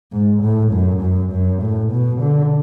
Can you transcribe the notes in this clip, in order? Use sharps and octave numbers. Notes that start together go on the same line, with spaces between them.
G#2
A2
F#2
F#2
F#2
A2
B2
D3